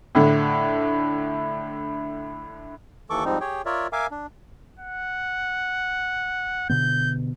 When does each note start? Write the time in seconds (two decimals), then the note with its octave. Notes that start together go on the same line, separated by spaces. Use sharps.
0.15 A2 D3
3.10 D#2 E3 A4 C#6 D6
3.25 G#2 F3 G3 C4 D#4
3.41 G4 G#4 C#5 G5
3.66 F4 A#4 C#5 D5 E5
3.92 A#4 E5 F5 G#5 D6
4.11 D4
4.80 F#5
6.70 B2 D3 B3 G6